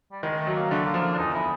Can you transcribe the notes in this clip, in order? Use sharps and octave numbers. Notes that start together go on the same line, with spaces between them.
G3
D#3 G#3
A3
F#3
A#3
D3 A3
A#3
F3
A#3
D4
E2 D#4
E4